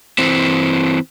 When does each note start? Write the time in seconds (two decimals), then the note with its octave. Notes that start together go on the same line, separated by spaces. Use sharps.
0.18 E3 C4